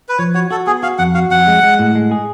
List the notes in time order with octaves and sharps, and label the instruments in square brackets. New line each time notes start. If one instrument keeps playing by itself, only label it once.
[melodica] B4
[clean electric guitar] F3 [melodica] C#5
[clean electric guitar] F#4 [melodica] C#5
[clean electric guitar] F#4 [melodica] A4
[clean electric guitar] B3 [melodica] G#4
[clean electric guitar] F#4 [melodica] F5
[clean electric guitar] F2 [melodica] F#5
[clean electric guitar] F#4 [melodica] F5
[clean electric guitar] F2 [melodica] F#5
[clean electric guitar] G#3
G#3
A2
G#3
G#4